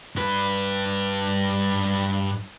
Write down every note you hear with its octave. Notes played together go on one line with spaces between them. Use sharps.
G2 B4